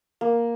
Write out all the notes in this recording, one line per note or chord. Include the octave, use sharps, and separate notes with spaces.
A#3